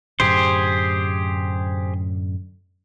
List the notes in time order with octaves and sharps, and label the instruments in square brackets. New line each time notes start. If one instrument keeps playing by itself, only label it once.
[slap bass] F#2 A2 D3 [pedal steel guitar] G4 G#4 C5